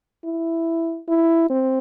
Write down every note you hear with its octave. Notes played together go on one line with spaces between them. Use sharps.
E4
E4
C4